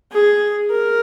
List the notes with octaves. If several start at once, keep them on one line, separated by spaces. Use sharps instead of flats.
G#4
A#4